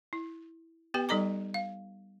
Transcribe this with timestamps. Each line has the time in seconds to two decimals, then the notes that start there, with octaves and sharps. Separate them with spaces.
0.13 E4
0.94 B3 G4 B4 G5
1.09 G3 D#4 A4 D#5 A#5 D6
1.54 F5